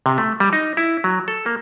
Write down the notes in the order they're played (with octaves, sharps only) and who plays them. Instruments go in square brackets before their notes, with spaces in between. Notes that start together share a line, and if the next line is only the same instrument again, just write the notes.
[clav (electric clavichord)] C3
A3
G3
D#4
E4
F#3
A4
A#3